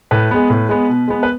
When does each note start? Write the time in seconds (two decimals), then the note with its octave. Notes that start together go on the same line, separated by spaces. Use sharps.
0.11 A2 B4
0.31 G#3 B3
0.50 A2
0.69 G#3 B3
0.88 B2
1.08 G#3 B3
1.23 B4